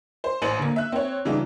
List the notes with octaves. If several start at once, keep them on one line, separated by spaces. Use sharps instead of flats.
C5
A1 C5 C#7 D#7 F#7
D3 A#3
E5 F#6
C4 C#5
C#3 E3 G3 D4 D#4 F4